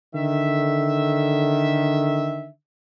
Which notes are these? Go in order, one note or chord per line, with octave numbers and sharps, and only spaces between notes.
D3 D#3 E5